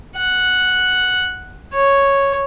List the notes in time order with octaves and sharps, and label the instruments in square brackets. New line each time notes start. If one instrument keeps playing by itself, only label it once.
[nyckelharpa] F#5
C#5